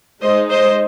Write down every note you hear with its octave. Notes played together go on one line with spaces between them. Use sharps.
G#3 D#4 C5 D#5
C5 D#5